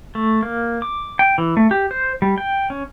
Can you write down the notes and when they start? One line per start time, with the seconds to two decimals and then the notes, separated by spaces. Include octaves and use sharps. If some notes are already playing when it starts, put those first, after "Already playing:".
0.15 A3
0.43 A#3
0.82 D6
1.19 G5
1.38 E3
1.57 A3
1.71 G4
1.91 C5
2.22 G3
2.38 G5
2.70 C#4